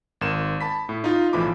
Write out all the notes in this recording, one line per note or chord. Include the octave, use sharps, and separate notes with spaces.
G#1 A#4 C6 E7
A5 B5 B6
A2
D#4 F4
B1 A2 E3 F3 B5 D6